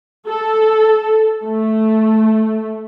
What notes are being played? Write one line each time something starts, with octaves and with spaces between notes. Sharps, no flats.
A4
A3